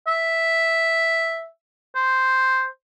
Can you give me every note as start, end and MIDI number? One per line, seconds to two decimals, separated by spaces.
0.07 1.45 76
1.95 2.66 72